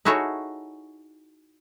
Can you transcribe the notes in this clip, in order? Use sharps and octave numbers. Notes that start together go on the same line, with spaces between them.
D#4 E4 F#4 G#4 A4 C#5